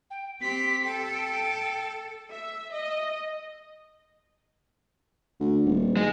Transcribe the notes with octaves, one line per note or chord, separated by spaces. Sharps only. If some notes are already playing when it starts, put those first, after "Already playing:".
G5
C4 G4 B6
A4 G5
E5
D#5
D2
D#1
G#3